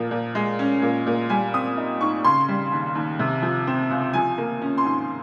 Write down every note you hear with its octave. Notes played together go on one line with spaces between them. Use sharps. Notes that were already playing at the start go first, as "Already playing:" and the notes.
Already playing: A#2 F3 A#3
A#2
G#3
C#4
A#2
A#2
G3 G#5
C4 D#6
D#4
G#2 C#6
C#3 C6
G3
D#2
D#2
C3
F3
C4
C#2
F3 G#5
A#3
C#4
C6
G#2